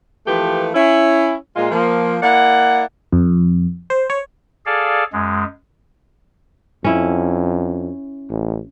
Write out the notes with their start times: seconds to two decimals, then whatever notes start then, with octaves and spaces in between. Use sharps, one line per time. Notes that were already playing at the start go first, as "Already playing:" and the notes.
0.27 E3 F3 A3 A#3 G4 B4
0.75 C#4 E4
1.56 A#2 G#3 F4
1.72 F3 A#3
2.23 A#3 E4 D5 F#5
3.13 F2
3.90 C5
4.10 C#5
4.66 G#4 A4 D5 F5
5.13 F#2 G#3
6.84 F2 C#4 E4
8.30 A1